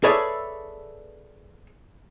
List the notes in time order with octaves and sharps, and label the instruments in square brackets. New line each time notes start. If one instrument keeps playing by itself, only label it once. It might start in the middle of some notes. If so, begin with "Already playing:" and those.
[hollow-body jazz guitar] G#4 A4 B4 C#5 D5 E5